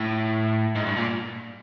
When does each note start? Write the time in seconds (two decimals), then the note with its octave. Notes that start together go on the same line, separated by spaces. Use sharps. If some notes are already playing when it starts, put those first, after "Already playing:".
Already playing: A2
0.75 G#2
0.86 G2
0.96 A#2